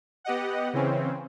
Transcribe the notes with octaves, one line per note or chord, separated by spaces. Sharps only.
B3 G4 D#5 F#5
C#3 E3 C4 C#4